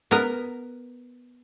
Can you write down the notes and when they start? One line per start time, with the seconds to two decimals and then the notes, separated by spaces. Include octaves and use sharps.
0.11 B3 A#4